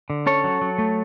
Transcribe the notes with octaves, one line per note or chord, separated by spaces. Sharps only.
D3
C#4 A4 C#5
F#3
F#3
A3